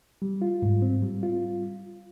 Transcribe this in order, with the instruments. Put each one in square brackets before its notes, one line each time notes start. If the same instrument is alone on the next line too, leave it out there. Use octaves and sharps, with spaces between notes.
[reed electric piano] G3
F4
G#2
C4
G3
F4